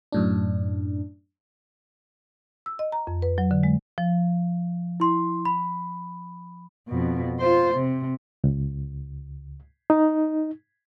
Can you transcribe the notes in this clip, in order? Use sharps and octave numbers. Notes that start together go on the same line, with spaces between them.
F#2 A2 D4
E6
D#5
A#5
F2
B4
F#3
D3
G#3
F3
E4 C6
B5
F2 B2
F4 C5
C3
C#2
D#4